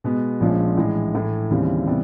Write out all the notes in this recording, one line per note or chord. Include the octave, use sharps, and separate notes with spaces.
B2 G#3 B3
A#1 A#2 F3 G#3 C#4
A2 E3 G#3
A2 E3 A3
D#2 C#3 E3 G3 C4
C3 E3 G3 B3